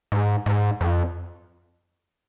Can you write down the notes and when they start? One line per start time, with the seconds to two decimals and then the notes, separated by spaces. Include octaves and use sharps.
0.12 G#2
0.46 G#2
0.81 F2